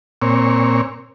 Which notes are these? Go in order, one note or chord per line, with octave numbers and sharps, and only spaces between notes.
A#2 C4 C#5